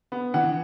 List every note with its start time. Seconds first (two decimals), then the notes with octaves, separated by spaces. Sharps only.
0.12 B3
0.34 E3 F#5